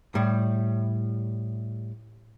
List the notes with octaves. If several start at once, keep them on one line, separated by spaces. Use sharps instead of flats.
A2 G3